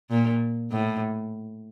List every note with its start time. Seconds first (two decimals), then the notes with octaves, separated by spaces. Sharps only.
0.10 A#2
0.71 A2